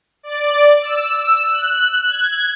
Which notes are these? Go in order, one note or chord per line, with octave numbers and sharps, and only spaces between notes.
D5
E6
F#6
G#6